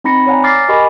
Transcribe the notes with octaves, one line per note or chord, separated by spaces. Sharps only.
C4 D#4 B5 A#6 C#7
C#5 D5 F#5 G#5 A#5
D6 F6 A6 A#6 C7
G4 A#4 D#5 G#5 B5 C#6